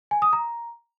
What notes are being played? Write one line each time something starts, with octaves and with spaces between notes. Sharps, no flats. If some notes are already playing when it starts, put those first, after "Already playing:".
G#5
D#6
A#5